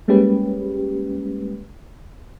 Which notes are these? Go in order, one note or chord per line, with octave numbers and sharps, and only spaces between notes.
G3 G#3 A#3 C#4 G4 B4